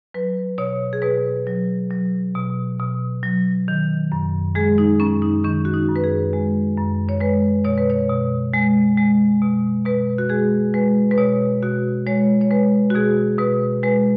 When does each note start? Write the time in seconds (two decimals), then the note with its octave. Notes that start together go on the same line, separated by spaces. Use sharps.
0.14 F#3 B4
0.58 B2 C#5
0.93 G#4
1.02 B2 B4
1.47 F#3
1.91 F#3
2.35 B2
2.79 B2
3.23 F#3
3.68 D#3
4.12 F#2
4.55 G#3 G#4
4.78 D#4
5.00 F#2 C#4
5.22 D#4
5.44 D#3 C#4
5.65 F#4
5.74 D#4
5.88 F#2
5.96 B4
6.04 G#4
6.33 G#3
6.77 F#2
7.09 C#5
7.21 G#3 B4
7.65 B2 C#5
7.78 B4
7.90 C#5
8.10 B2
8.53 G#3
8.97 G#3
9.42 B2
9.86 B2 B4
10.18 F#4
10.30 G#3 G#4
10.74 G#3 B4
11.11 B4
11.18 B2 C#5
11.63 B2 F#4
12.06 G#3 C#5
12.41 C#5
12.51 G#3 B4
12.90 F#4
12.94 B2 G#4
13.39 B2 B4
13.83 G#3 B4